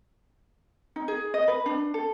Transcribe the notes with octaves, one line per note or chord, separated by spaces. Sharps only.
D#4
G#4
D#5
B4
D4
A4